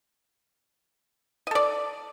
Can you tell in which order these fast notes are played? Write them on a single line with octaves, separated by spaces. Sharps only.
D#5 A4 D5